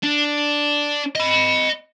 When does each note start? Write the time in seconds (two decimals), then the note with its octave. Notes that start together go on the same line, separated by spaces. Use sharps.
0.03 D4
1.15 D#5 B5